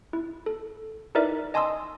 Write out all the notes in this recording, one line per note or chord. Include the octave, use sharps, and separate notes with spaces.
E4
A4
D#4 E4 A#4 B4 D5 E5
D#5 G#5 A5 C6 D#6 E6